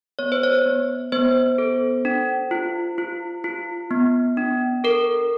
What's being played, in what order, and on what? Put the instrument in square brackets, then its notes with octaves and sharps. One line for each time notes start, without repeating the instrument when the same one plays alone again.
[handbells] B3 C#5
C5
C#5
B3
B3 C5
A4
D4
F4
F4
F4
B3
D4
A4 A#4